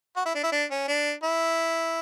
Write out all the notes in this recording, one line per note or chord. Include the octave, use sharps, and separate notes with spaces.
F#4
E4
D4
E4
D4
C#4
D4
E4